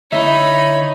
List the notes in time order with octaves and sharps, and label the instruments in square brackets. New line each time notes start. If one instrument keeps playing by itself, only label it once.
[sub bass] D3 [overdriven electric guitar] D#4 [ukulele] E4 E5 [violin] C#5 B5